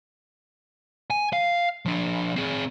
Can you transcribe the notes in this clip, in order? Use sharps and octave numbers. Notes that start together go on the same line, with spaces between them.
G#5
F5
F3 D4
C4 G#4